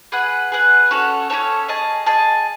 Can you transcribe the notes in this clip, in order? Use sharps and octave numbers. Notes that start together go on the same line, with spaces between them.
G#4 B4 F#5
G#4 B4 F#5
C#4 F#4 A4 C#5
C#4 F#4 A4 C#5
G#4 D#5 A5
G#4 D#5 A5